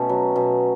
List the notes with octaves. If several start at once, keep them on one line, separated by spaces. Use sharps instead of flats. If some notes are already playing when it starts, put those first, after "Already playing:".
Already playing: B2 A3 C#4
F#3
B2